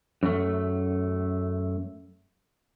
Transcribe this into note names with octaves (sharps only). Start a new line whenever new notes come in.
F#2 A3